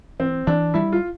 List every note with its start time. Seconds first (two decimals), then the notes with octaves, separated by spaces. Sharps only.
0.20 E3 C4
0.47 E3 D4
0.74 G3 E4
0.92 F4